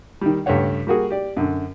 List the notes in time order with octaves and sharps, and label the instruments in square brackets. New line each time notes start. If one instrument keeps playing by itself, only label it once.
[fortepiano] D#3 G3
C#2 G2 A3 G4 C#5 F#5
G3 A#3 F#4 G#4
G4 D5
F#2 D3